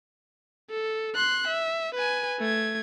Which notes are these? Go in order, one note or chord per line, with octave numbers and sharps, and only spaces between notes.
A4
C6 F#6
E5
B4 G#5
A3 G#6